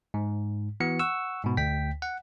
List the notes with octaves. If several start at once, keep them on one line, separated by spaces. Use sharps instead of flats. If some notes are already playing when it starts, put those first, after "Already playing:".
G#2
E3 B3 F#4 C#7
F#5 C#6 E6
G#2 B2
D2 G5 B6
F#5